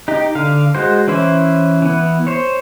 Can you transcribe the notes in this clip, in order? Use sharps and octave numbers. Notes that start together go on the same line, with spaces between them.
D#4 G4
D3 F5
G#3 F#4 C5
E3 C#4 E4 C5
E3 B3
C5 C#5